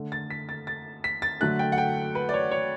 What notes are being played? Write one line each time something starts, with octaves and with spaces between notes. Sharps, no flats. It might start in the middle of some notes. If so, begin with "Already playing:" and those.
Already playing: D3 A3
A6
B6
A6
A6
B6
A6
D3 F#3 A3 F#6
G5
F#5
G5
B4
D5
C#5
C#5